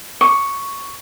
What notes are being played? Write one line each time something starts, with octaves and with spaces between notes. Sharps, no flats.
C#6